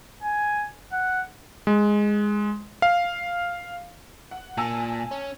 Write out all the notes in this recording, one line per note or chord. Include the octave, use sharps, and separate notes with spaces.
G#5
F#5
G#3
F5
F#5
A#2 G#5 A5 E6
C#4